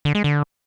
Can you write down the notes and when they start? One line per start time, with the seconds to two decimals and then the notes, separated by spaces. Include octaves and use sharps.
0.05 D3
0.15 G#3
0.24 D3